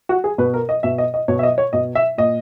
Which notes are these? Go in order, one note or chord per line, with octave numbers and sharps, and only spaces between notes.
F#4
G#4
B2 B4
A#4
D#5
B2 E5
D#5
D#5
B2 C#5
E5
D#5
C#5
B2 D#5
E5
A#2 D#5